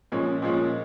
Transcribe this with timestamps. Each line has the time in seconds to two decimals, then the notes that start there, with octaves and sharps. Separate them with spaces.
0.12 A#2 F3 G#3 C#4
0.42 A#2 F3 G#3 C#4